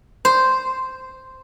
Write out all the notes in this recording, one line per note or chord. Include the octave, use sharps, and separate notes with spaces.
C5